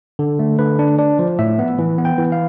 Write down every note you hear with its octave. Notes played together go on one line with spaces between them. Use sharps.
D3
A3
D3 B4
D4
D4 D5
F3
A2 E5
B3
E3
B3
G5
E3
F5